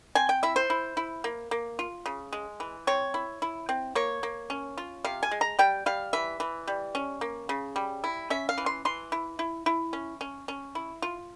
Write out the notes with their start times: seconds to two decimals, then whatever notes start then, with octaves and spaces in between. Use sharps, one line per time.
0.15 C4 G#5
0.29 G5
0.43 E4 E5
0.56 C5
0.70 E4
0.97 E4
1.24 A#3
1.51 A#3
1.79 F4
2.06 C#3
2.33 G#3
2.60 E3
2.87 C4 C#5
3.14 E4
3.42 E4
3.69 C4
3.95 A#3 C#5
4.23 A#3
4.50 C#4
4.78 F4
5.05 C3 F5
5.23 G#5
5.31 G#3
5.41 A#5
5.59 G3 G5
5.86 G3 F5
6.13 E3 E5
6.40 E3
6.68 G3
6.95 C#4
7.21 A#3
7.49 C#3
7.76 G3
8.04 E4
8.30 C#4 E5
8.49 F5
8.58 E3
8.66 C6
8.85 E3 C6
9.12 E4
9.39 E4
9.66 E4
9.93 C#4
10.21 C#4
10.48 C#4
10.75 E4
11.02 F4